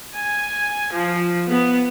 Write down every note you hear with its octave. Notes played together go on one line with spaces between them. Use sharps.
G#5
F3
B3